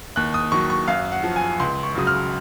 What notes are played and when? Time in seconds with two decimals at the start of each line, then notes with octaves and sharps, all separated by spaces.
0.16 D#2 F#6
0.34 D#6
0.52 D#3 F#3 C#6
0.70 C#6
0.88 F#2 F5
1.12 F#5
1.23 F3
1.36 G#5
1.60 C#2 C6
1.83 C#6
1.95 C#3 F#3 D#6
2.07 F6